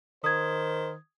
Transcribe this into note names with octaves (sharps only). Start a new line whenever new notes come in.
D#3 C5 D#6 G#6